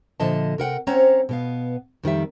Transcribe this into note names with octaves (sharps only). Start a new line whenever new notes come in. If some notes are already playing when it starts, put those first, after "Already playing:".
A#2 D3 F3 D#5 E5 A5
C3 A#4 F#5 G5
C4 C#4 C5 C#5 F#5 A#5
B2 B3 F5
F2 D#3 G3 E5